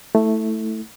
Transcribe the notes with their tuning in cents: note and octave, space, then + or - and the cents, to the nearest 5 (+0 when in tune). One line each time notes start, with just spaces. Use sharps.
A3 +0 E4 -15